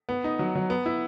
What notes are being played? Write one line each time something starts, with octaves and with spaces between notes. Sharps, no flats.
B3
D#4
F#3
F#3
B3
E4